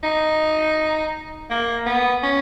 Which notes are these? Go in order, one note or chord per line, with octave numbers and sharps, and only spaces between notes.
D#4
A#3
B3
C#4